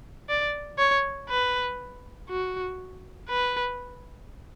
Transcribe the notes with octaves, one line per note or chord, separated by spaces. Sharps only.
D5
C#5
B4
F#4
B4